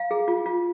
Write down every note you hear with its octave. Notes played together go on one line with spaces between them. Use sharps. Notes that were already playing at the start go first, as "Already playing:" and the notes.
Already playing: F5
G#4
F4
F4